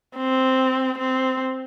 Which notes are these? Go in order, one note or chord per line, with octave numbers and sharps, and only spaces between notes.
C4
C4